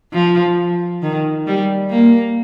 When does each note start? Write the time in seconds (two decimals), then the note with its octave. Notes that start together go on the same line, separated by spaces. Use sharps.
0.13 F3
1.02 D#3
1.47 G3
1.90 A#3